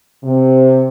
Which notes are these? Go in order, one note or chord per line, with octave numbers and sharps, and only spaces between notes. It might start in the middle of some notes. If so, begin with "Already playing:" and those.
C3